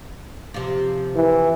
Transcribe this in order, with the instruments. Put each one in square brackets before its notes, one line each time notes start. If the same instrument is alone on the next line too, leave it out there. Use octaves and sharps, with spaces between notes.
[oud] C3 F3
[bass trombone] E3